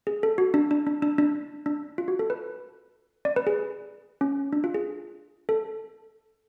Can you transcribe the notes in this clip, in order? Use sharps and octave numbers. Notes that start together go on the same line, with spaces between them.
G#4
A4
F#4
D4
D4
D4
D4
D4
D4
F4
F#4
A4
B4
D5
B4
G#4
C#4
D4
F4
G#4
A4